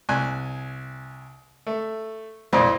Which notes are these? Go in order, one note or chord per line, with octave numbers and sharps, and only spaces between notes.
C2 G#5 F#6
A3
B1 F2 A#2 E4 C5 D5